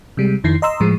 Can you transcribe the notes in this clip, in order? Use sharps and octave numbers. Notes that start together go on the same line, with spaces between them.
C3 G3 G#3
F2 D#3 E4 C7
D#5 A#5 C6 E6
A2 F3 G#3